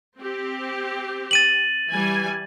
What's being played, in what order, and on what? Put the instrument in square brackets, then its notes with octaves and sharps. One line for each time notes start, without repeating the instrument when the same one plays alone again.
[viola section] C4 G4
[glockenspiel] A6 D#7 F#7
[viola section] E3 G3 G#5